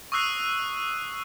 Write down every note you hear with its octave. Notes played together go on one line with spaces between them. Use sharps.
C#6 D#6 E6 F#6 C7 D#7